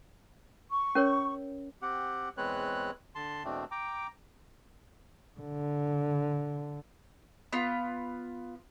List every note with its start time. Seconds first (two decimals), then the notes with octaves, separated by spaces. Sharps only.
0.71 C#6
0.95 C#4 A#4 C#5
1.82 C4 G4 F#5
2.37 E2 G#3 C4 B4 C#5 F#6
3.15 D3 A5 C6
3.44 E2 B2 A3 C4 D4
3.71 G5 A#5 D6
5.40 D3
7.53 B3 F4